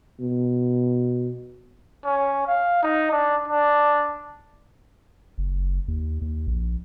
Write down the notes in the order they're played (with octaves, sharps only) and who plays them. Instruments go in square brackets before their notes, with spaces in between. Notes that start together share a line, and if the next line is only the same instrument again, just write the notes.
[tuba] B2
[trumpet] C#4
F5
D#4
D4
D4
[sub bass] F#1
D#2
D#2
A#1